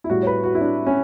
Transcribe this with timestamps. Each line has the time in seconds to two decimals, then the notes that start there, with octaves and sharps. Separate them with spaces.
0.04 E4
0.10 A2 G3 F#4
0.23 C#5
0.27 B4
0.44 F#4
0.55 E4
0.61 D4
0.87 C#4